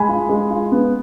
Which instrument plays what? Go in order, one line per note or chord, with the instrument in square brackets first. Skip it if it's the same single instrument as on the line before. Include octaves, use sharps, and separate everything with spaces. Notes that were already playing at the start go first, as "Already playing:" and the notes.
Already playing: [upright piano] G#3 [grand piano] G#5 B5
[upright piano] F4
G#3
F4
B3